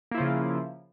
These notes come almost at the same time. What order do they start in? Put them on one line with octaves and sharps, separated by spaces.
A#3 E4 F3 C#3